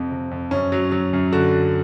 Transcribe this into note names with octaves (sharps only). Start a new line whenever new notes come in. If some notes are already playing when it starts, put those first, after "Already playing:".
Already playing: F2 C3 C4
C3
F2
F#2 C#4
F#3
F#3
F#2
D3 F#4